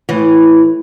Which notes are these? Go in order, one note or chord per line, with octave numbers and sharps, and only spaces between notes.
A2 E3